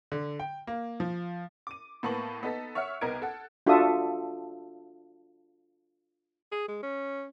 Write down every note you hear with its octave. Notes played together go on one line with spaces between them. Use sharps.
D3
G5
A#3
F3
D6 D#7
A2 A#3 B3 A5 C#6 F#7
B3 D#4 A4 B6
C#5 E5 F#5 F6 C#7
C2 B3 D#4 A#4 G#6 D7
A4 F#5
D4 F4 F#4 A4 E5 D#6
G#4
G#3
C#4